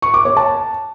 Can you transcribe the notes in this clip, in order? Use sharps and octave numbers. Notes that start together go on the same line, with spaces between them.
C#6
D6
C#5
A5